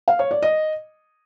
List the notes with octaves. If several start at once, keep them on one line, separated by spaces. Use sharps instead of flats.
F5
C#5
D5
D#5